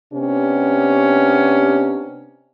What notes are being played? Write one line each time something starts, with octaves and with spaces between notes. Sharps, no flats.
C3 B3 C#4 D4 G4